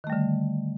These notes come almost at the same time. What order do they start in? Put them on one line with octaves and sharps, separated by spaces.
D#3 A3 G3 D3